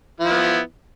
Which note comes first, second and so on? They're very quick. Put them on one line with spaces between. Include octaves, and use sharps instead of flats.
F3 E4 B3